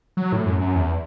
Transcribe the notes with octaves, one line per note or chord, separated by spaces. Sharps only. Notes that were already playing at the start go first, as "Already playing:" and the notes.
F#3
A2
F#2
F#2
E2